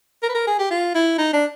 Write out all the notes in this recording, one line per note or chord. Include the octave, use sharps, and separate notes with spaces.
A#4
B4
A#4
G#4
G4
F4
E4
D#4
D4